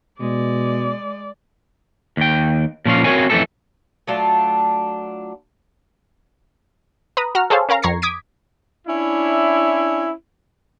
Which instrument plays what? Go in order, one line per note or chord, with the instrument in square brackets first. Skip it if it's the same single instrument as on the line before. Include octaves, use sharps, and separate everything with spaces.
[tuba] B2 [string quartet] G#3 [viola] D5
[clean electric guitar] D#2 G5
A#2 F3 C#4 F5
C4 F#4 A#4 C#5 F5 G#5
F2 E3 G#3 A3 C#4 A4
[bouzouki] F#3 A3 D4 F4
[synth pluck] B4 A#5 B5 D#6
F#4 F#5 A#5 F6
G#4 A4 C5 C#5 F5
C#4 A#4 F5 A#5
F2 A#5 C#6 G#6 A#6 C7
D6 D#6 G#6 B6 D7
[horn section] C#4 D4 E4